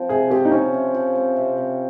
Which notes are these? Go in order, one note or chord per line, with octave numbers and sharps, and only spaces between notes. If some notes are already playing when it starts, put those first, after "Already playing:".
Already playing: F3 C4
C3 G#4
C4 G4
D#4
C4 C#4
C3
F3
C4
C3
C3